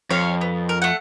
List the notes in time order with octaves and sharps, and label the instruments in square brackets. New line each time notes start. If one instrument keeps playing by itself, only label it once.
[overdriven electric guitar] F2 [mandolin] C#5 F5
[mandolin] B3
A#4
A3 F#5